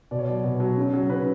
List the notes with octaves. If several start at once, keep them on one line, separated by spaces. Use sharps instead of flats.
B2 D5
C#5
F#3 D5
B2
F#3
C#3
F#3
C#3 B4